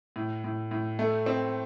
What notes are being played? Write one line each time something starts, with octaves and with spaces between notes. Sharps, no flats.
A2
A2
A2
A3
C4